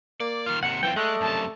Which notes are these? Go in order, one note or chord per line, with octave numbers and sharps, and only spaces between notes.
A#3 D5
D#3 F4 F6
D#2 C3 F#5 C#7
F#2 E3 C4 F4 G5
G#3 A3 D5 D#5 F#6
F#2 C3 A5